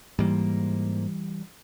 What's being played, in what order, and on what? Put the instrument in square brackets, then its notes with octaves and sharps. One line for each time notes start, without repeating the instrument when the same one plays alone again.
[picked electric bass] G#2 A#3 [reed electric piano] E3 G3